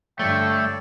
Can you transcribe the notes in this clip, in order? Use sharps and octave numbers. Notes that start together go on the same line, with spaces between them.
G2 D3 A3 A4 C#5 D5 G5